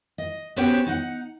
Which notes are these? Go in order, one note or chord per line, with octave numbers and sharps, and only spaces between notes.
D#5
B3 C#4 F#4 G4 C5 C#5
D#4 F#5